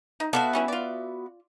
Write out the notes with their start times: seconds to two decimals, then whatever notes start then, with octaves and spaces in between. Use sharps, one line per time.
0.20 D#4
0.33 B3 F#4 A4 D5 E5 F5
0.53 G3 C#4 E4
0.68 F4 D5